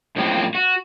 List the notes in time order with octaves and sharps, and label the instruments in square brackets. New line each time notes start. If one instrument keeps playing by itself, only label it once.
[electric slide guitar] F#2 A2 F3 A#3 C4
F#4